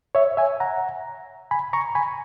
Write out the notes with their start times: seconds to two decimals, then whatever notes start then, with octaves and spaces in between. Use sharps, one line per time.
0.15 C#5 E5
0.37 E5 G#5
0.60 F#5 A#5
1.51 G#5 B5
1.73 A#5 C#6
1.95 G#5 B5